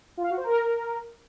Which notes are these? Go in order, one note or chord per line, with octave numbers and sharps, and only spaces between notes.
F4
F5
F#4
C5
A#4